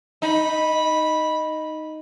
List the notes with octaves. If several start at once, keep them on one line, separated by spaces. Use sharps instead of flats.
D#4 B5